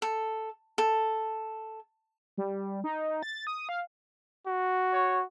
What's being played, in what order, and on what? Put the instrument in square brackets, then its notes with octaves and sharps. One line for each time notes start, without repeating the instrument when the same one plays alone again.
[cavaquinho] A4
A4
[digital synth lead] G3
D#4
A6
D#6
F5
[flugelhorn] F#4
[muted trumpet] C#5